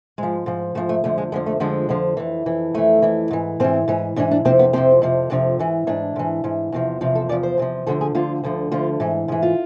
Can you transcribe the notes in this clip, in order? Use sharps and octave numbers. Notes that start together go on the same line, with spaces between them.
G#2 F3 G#3
G#2 F3
G#2 F3 A3
A3
F2 D3 F3 A3
G#3
F2 D3 F3 G#3
A3
F2 D3 F3 G#3
F2 D3 F3
F2 E3
F2 E3
F2 E3 A3
F2 E3
G#2 E3
G#2 E3 C4
G#2 E3
G#2 E3 D4
D4
F2 C3 F3 C4
B3
F2 C3 F3 C4
F2 C3 F3
F2 C3 F3 D4
G#2 E3
G#2 E3 D4
G#2 E3
G#2 E3
E2 C3 F3
E2 C3 F3 F4
A4
E2 C3 F3 D5
C5
E2 C3 F3
D2 D3 F3 A4
G#4
D2 D3 F3 F4
D2 D3 F3
D2 D3 F3 F4
G#2 E3
G#2 E3 G#4
F4